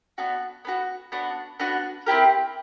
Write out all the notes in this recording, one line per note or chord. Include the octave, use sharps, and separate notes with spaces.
B3 D4 F#4
B3 D4 F#4
B3 D4 F#4
B3 D4 F#4
C4 E4 G4 A#4